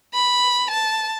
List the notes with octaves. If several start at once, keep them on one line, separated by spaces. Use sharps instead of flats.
B5
A5